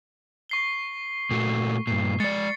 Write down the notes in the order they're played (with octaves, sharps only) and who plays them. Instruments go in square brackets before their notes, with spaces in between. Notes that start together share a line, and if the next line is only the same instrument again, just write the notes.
[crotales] C#6 C7 G7
[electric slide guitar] A#2 A3 F#4
[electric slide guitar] G2 A#2 [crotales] C7
[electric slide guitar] G#3 D5 [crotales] A6 C#7